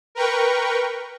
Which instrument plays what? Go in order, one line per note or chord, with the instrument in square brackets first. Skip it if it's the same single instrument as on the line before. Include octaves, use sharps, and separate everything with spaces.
[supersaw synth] A#4 B4 G5 C#6